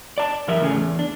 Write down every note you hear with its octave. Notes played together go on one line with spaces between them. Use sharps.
D5 A5
F#2 E3 A#4 D5 E5
A2 C#3 A3 C#4 G#4
E2
D4